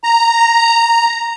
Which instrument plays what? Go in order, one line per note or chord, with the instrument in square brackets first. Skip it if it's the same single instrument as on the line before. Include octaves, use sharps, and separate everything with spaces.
[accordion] A#5